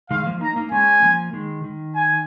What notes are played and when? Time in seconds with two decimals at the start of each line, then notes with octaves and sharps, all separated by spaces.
0.10 D#3 G#3 F5
0.26 F3 A#3
0.41 A#3 D#4 A#5
0.56 A#3 D#4
0.71 G#3 C#4 G#5
1.02 F3 A#3
1.33 D#3 G#3
1.64 D#3
1.95 G#5